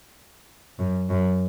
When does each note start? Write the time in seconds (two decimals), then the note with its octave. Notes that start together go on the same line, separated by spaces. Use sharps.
0.79 F#2
1.10 F#2